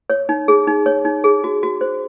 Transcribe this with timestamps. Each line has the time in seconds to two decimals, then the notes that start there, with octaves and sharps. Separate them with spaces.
0.10 C#5
0.29 D#4
0.48 G#4
0.67 D#4
0.86 C#5
1.05 D#4
1.24 G#4
1.44 F#4
1.63 F#4
1.81 C5